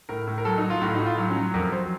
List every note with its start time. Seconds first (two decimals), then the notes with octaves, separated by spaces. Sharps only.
0.09 A2 A#4
0.27 A2
0.38 A#4
0.45 F#3 A4
0.58 D#4
0.63 F#3
0.70 F4
0.82 A2 F#4
0.95 A2 D#4
1.06 F4
1.18 F#3
1.30 C#4
1.36 F#3
1.54 F2 A#4
1.72 F#3 C5